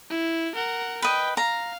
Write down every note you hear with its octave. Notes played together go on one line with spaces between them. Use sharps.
E4
A#4 F#5
B4 D#5 G5
F5 A#5